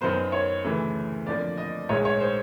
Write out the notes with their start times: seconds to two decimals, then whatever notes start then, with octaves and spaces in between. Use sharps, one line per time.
0.01 F#2 D#3 F#3 B3 C5
0.32 C#5
0.64 D2 C#3 E3 A3
1.26 F2 D3 F3 A#3 D5
1.58 D#5
1.89 A#1 G#2 D#3 G#3 C#5
2.05 C#5
2.20 C5